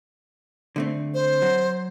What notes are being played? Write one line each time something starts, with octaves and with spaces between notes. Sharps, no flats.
D3 A3 C4
C5
F#3